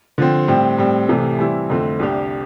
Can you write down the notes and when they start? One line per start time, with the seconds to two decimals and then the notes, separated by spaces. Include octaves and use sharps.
0.18 D3 F3 C4
0.48 A2 G3 C4 G4
0.78 A2 G3 C4
1.09 C2 C3 E3 A3
1.39 E3 G3 C4 E4
1.70 F2 D3 A3 C4
1.99 C2 C3 G3 D4 G4